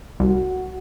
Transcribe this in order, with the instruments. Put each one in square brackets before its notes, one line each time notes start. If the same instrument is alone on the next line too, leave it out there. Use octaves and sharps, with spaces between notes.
[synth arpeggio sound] C2 [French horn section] F#4